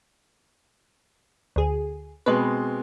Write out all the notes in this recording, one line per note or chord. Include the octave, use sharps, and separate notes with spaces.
D2 G#4
B2 G#3 C4 B4